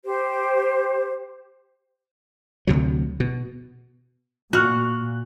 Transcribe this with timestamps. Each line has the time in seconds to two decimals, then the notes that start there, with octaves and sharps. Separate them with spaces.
0.04 G4 C5
2.67 D2 C3 F#3
3.20 B2
4.53 A#2 F#4 C#6 F6 F#6